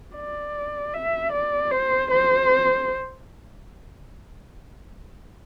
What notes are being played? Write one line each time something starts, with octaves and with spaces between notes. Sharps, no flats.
D5
E5
D5
C5
C5